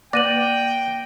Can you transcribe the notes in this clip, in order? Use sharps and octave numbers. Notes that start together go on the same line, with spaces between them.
A#3 B4 D5 G5 A#6 D#7 F#7